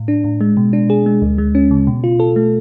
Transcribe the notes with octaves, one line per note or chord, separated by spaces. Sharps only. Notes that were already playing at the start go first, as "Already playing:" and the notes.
Already playing: A2
D4
A2
G#3
B2
D4
G#4
G#3
D2
G#3
C#4
C#3
B2
F4
A4
A3